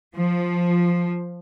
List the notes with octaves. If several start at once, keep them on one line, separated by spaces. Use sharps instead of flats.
F3